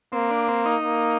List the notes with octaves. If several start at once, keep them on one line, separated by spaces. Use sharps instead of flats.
A#3 C4
D4
C4
D#4
A#3